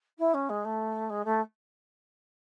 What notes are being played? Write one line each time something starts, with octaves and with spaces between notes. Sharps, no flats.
E4
C#4
G#3
A3
G#3
A3